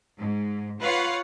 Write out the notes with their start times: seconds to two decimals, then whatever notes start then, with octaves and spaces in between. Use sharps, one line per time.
0.20 G#2
0.82 F4 B4 C#5 F5 F#5